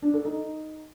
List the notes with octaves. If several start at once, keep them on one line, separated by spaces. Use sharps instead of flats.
D4
A4
D#4